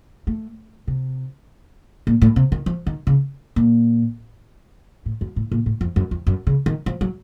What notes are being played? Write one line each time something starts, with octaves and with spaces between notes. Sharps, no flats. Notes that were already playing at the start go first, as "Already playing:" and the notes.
A3
C3
A#2
A2
C3
D#3
F3
D#3
C#3
A#2
A2
F#2
A2
A#2
A2
F2
F#2
F2
F#2
C#3
D#3
F3
F#3